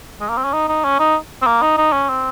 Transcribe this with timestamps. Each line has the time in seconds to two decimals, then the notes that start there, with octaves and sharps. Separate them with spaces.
0.21 G#3
0.29 A#3
0.37 C4
0.44 C#4
0.53 D#4
0.68 D#4
0.84 C#4
0.99 D#4
1.42 C4
1.47 A#3
1.62 D#4
1.78 D#4
1.93 C#4
2.09 C4